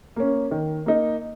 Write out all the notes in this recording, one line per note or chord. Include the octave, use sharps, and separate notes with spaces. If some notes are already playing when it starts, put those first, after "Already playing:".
A#3 C#4
D#3
A#3 D#4